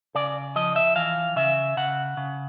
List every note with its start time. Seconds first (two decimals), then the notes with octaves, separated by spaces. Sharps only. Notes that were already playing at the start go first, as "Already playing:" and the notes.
0.15 C#3 D5
0.56 F3 D#5
0.76 E5
0.96 E3 F5
1.36 C#3 E5
1.77 C#3 F#5
2.17 C#3